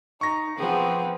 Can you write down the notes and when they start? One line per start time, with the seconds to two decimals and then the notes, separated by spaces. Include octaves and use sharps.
0.21 D#4 C#6 A#6
0.57 F3 B3 C4 G#4